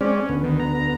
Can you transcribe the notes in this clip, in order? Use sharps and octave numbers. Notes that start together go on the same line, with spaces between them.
G#3 C4 C#4 D5
D2 B3
D#3
A#5
A#5